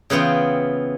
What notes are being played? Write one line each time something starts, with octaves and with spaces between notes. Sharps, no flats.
C#3 E3 B3 F4 G5